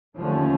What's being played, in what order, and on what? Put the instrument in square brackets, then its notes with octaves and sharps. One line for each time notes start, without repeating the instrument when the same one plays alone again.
[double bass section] D#2 D3 F3 A3 C#4